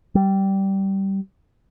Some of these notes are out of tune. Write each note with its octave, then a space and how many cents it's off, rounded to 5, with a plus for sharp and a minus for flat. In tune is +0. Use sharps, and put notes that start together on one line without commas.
G3 -15